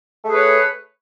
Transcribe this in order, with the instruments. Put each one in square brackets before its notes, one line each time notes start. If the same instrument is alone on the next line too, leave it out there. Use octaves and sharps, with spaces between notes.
[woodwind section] A3
G#4
B4
C#5